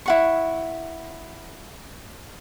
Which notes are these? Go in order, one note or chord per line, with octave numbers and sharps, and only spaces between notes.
E4 F#5 C#6